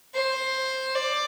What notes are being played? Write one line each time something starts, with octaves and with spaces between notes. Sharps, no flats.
C5
D5